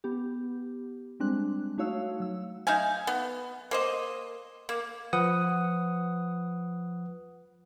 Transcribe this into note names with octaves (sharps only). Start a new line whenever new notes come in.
B3 G4
G3 G#3 C4 D4 F#6
A3 D#4 F#4 C#5 F5 E6
F#3 E6
D#4 E5 F5 G#5
B3
A#3 C5 D#5
A#3
F3 B4 F#5 D#6